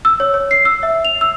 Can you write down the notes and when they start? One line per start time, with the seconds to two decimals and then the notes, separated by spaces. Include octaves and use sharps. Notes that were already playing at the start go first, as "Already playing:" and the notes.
0.05 E6
0.20 C#5
0.34 C#5
0.51 C7
0.65 E6
0.83 E5
1.05 F7
1.21 E6